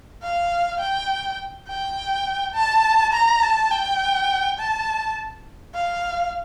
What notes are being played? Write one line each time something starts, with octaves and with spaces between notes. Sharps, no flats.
F5
G5
G5
A5
A#5
A5
G5
A5
F5